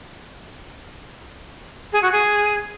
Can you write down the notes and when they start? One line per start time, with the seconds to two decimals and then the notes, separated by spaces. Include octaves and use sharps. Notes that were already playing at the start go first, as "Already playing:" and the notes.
1.93 G#4
2.03 F#4
2.12 G#4